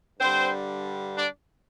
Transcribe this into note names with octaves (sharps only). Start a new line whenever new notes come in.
G2 D3 G3 C4 C5
D4 D5